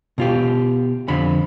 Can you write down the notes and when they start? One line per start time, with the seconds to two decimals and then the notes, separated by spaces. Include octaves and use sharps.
0.18 B2 F4 G4
1.08 F2 D3 B5